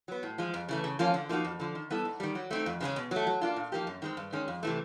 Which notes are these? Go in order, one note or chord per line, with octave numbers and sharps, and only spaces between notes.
F#3 B3
A2
F3 G#3
F2
C#3 E3 A3
C#3
F3 A#3 C#4 F4
D3
F3 A#3 D#4 F#4
F2
D3 F3
D#3
G3 B3 E4 A4
G#2
D#3 G3
F#3
A3 C4 D#4
F2
C#3 F3 G#3 C#4
B2
F#3 A3
F#3
A#3 D4 F4
A#2
F3 A#3 D#4 G4
F#2
D#3 G#3 C4
G2
D#3 G#3 C#4
F2
C3 E3 A3